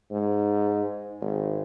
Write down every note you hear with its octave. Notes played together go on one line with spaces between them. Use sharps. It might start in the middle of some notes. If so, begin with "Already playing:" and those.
G#2
G#1